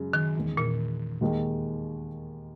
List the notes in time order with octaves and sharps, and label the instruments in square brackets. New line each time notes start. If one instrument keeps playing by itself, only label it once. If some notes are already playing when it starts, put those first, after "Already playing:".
Already playing: [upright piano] F#2 C#3 G#3
[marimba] D#3
[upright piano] E2 D#3 G#3
[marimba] A#2
[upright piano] D#2 D#3 G#3